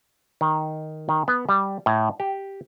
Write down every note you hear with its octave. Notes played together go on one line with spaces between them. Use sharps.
D#3
D#3
B3
G3
A2
G4